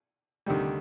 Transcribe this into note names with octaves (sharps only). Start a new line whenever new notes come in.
D2 C3 D#3 G3